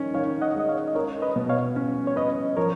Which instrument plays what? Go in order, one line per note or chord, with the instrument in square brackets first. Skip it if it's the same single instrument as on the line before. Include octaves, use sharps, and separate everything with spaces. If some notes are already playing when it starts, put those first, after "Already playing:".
Already playing: [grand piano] D#3 C#4
[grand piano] D#3 [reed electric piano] C#5 F5
[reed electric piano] D#5 F#5
[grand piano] G#3 [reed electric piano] D#5
[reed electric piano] C#5 F5
D#5
[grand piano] C#4 [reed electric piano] A#4 C#5
[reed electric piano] B4 D#5
[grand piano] B2
[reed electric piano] C#5 F5
[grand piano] C#4
[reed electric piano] C#5
[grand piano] C#4 [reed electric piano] B4 D#5
[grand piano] F3 [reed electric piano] A#4 C#5